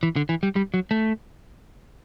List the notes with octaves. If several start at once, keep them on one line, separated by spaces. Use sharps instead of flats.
E3
D3
E3
G3
G3
F#3
A3